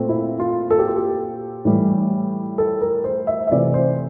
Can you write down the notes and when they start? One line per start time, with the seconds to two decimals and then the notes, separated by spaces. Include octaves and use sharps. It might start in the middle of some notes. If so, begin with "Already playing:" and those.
Already playing: A#2 A3 C4
0.09 E4
0.40 F4
0.70 A4
0.79 G4
0.88 F4
0.96 G4
1.65 A2 E3 G3
2.58 A4
2.81 A#4
3.04 C5
3.27 E5
3.47 E5
3.51 C3 E3 A3 D5
3.74 C5